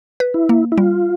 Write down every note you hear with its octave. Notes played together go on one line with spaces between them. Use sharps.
B4
E4
A#3
E4
G3 F4